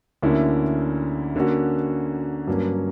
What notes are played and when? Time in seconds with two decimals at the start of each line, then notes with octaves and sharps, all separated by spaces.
0.22 D2 D3 A#3 C#4 E4
1.36 D3 A#3 C#4 F#4
2.47 G2 F#3 A#3 C#4